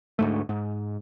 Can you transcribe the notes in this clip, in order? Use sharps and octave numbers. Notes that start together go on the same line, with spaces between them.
D2 G#2 A3
G#2